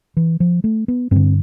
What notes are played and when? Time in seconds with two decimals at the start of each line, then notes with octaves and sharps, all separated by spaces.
0.17 E3
0.40 F3
0.64 A3
0.88 B3
1.11 G2 D3 C4